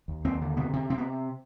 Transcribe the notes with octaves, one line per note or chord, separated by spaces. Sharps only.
D#2
D#2 C4
D3
C3 B3
C3
C3 C4
B3